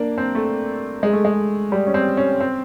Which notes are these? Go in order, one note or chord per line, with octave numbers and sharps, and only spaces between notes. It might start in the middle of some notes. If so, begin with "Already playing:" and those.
Already playing: A#3 D4
C4
A3
G#3
A3
G#3
G3
C#4
C4
C#4
C4